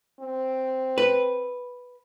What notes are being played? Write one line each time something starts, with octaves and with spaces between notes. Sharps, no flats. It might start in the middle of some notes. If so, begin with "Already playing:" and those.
C4
B4